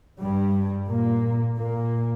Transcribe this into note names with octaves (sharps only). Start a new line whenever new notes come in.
G2 G3
A#2 A#3
A#2 A#3